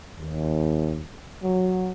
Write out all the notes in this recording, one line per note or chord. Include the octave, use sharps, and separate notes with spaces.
D#2
F#3